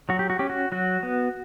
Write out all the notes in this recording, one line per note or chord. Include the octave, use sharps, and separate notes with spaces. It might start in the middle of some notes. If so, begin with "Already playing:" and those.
F#3 F#4
G4
F#4
C#4 G4
F#4
F#3 F#4
B3